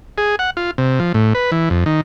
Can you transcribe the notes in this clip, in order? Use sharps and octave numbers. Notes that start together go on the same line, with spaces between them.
G#4
F#5
F4
C3
F3
A2
B4
E3
F2
D#3